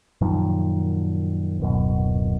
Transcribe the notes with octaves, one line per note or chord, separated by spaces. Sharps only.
F#2 A#2 D#3 F3
D1 F#2 B2